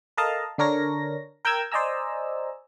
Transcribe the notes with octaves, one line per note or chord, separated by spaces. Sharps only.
A4 A#4 D#5 F5 A5 A#5
D3 D4 A#4 C#5 A#6
A#4 G5 A#5 E6 G#6
C5 D5 D#5 G#5 A#5 E6